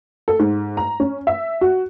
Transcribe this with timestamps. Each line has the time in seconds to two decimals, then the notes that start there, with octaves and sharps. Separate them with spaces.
0.28 A4
0.39 G#2
0.77 A#5
1.00 C#4
1.27 E5
1.61 F#4